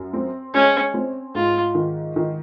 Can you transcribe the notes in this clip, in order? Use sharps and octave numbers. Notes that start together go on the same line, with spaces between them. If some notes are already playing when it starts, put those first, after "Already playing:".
Already playing: F#2
C4
G#3 C#4
C4
G#2 F4
D#3
D#3